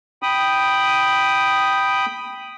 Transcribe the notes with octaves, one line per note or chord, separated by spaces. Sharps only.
G5 B5 D#6